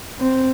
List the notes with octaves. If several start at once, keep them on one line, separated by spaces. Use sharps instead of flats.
C4